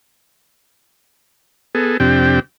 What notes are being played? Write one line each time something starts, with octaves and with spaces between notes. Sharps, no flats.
B3 G#4 A4
F2 C3 C4 D4 G4 G5